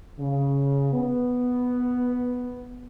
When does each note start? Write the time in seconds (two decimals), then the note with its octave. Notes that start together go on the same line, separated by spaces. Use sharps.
0.18 C#3
0.93 B3